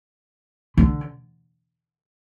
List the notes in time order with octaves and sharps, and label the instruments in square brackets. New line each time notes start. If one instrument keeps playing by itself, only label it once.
[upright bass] D3